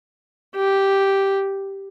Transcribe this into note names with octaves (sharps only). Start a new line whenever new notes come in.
G4